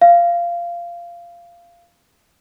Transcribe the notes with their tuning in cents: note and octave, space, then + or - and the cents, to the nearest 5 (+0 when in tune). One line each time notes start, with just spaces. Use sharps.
F5 -15